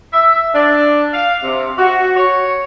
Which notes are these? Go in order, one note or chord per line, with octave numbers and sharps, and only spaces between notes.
E5
D4
F5
C3
F#4
C#5